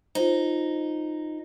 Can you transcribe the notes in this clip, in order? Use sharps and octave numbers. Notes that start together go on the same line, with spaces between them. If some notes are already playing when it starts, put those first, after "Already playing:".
D#4 F4 C5